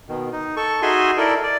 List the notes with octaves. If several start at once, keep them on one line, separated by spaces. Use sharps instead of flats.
B2 D#3
D#4
A4 C#6
D#4 F#4 G#4 E5 G#5 C6
E4 A4 A#4 D5
D5